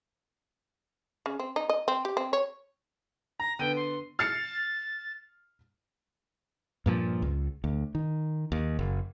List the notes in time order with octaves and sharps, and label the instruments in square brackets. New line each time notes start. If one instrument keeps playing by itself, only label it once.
[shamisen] C#3
C4
D#4
D#5
C4
G4
C4
C#5
[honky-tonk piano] A#5 [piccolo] A#6
[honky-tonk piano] D3 B3 D#7 [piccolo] G5
[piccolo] C6
[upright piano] F6 C7 C#7 [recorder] A6
[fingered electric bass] G2 A#2 F3
C#2
D2
D#3
D#2
F#1